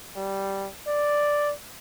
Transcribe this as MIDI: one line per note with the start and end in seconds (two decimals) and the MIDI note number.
0.17 0.69 55
0.87 1.53 74